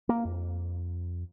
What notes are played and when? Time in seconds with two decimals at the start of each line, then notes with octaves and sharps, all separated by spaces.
0.09 A#3
0.25 F2